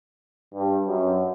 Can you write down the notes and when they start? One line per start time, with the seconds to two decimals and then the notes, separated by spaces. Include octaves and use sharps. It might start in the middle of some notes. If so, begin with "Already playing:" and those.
0.54 G2
0.87 F#2